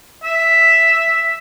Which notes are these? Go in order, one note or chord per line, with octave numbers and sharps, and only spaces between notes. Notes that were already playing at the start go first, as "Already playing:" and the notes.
E5